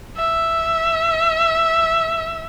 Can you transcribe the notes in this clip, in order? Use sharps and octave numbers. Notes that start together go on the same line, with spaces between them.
E5